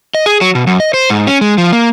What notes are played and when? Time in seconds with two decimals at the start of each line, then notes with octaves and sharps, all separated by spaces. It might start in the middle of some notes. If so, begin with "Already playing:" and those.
0.15 D#5
0.26 G#4
0.41 F#3
0.55 B2
0.67 F#2
0.80 D#5
0.94 C5
1.10 G#2
1.27 C#4
1.41 G#3
1.58 F3
1.73 A#3